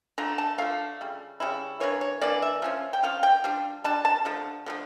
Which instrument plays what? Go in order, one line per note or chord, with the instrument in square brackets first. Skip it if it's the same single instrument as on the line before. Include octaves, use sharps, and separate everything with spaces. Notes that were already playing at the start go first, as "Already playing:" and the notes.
[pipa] D3 A3 D4 F4 A#5
A5
D3 A3 D4 F4 F5
C#3 G3
C#3 G3 C#4 E4
E3 A#3 D4 C#5
C#5
E3 A#3 D4 D5
E5
F3 C#4 F4
G5
F3 C#4 F4 F5
G5
G3 D4 F4
G3 D4 A5
A5
D3 F3 A3
D3 F3 A3